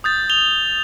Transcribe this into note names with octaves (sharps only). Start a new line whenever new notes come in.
D#6 G6 A6
F7 G7